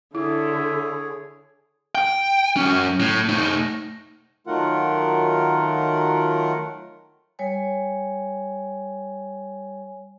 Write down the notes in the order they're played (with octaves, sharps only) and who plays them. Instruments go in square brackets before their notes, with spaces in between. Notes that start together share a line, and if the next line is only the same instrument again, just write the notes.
[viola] D3 [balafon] E4 [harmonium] G#4 C#5 [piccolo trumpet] E5
[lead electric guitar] G5
F#3 C#4
A2
A3 D#4
[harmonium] D#3 F#3 A3 F4 A#4 F#5
[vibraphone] G3 C#5 G#5